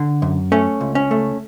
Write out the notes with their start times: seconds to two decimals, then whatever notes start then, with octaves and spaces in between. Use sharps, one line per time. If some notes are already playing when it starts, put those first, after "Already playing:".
Already playing: D3
0.22 F#2
0.52 A3 C#4
0.81 C#2
0.95 C#4
1.11 A3